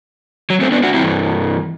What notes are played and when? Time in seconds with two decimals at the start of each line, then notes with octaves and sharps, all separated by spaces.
0.50 F#3
0.61 A3 C4
0.72 B3 D4
0.83 D4 F#4
0.94 G2 C4 E4
0.98 E3